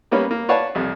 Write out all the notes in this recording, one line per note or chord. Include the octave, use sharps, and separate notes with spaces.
G3 A#3 B3 C#4
A#3
B4 C#5 D5 F5 F#5 A5
C2 F2